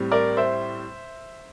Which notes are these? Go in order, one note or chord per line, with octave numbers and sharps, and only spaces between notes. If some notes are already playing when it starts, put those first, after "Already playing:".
Already playing: A2 G3 C4
A#4 D5
C5 E5